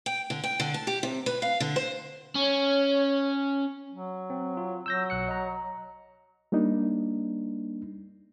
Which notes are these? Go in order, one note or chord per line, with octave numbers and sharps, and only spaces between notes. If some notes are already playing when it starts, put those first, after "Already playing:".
G5
D3
G5
D3
A5
G4
C3
B4
F5
D3
C5
C#4 C#5
F#3
C4
F4
F#3 E6 G6 A#6
B1 F#6 C#7
D#5 A#5
G3 A#3 D4 D#4